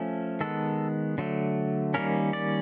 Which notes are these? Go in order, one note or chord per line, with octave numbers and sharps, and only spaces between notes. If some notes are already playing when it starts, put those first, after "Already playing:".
Already playing: F3 A3 C#4
D#3 G#3 B3 A4
D3 F#3 A3
D#3 G3 A#3 C#4 A#4
D5